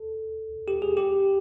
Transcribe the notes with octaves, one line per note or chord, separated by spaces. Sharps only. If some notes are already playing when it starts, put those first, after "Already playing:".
Already playing: A4
G4
G#4
G4